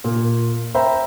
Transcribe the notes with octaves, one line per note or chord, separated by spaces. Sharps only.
A#2
C5 E5 G5 A#5 B5